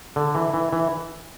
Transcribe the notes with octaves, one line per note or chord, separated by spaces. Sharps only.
D3
E3
E3
E3